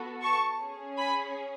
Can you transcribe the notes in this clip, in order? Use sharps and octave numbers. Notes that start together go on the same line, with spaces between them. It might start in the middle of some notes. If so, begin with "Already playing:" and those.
Already playing: B3 F#4 A4
A5 C#6
C#4 G#4
G#5 B5